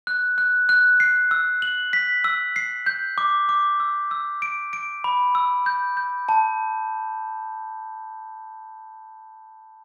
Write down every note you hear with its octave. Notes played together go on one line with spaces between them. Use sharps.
F#6
F#6
F#6
C7
E6
F#7
B6
E6
C7
G6
D6
D6
E6
E6
D7
D7
B5
E6
G6
G6
A5